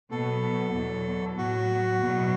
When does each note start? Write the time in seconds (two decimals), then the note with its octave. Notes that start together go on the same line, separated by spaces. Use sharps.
0.11 B2 F#3 B3 A4
0.74 E2 B2 F#3
1.37 A2 F#3 B3 F#4
2.01 E2 B2 F#3 B3